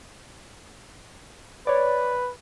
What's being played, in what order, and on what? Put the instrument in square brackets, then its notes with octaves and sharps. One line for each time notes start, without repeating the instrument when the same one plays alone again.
[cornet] B4 [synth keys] C#5 D5